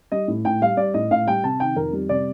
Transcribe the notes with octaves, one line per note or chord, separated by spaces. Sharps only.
G3 D#5
A2
A2 G5
G3 F5
G3 D5
A2 D#5
A2 F5
G3 G5
C3 A5
D#3 G5
F2 A#4
G3
C3 D5